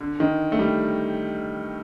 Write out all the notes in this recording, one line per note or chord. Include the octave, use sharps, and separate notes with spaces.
D3
D#3
A3
G3